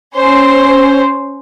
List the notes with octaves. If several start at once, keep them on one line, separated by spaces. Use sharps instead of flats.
C#4 C5